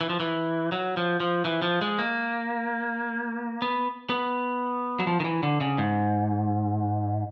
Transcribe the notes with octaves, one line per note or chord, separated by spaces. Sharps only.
E3
F3
E3
F#3
F3
F3
E3
F3
G#3
A#3
B3
B3
F#3
F3
D#3
E3
D3
C#3
G#2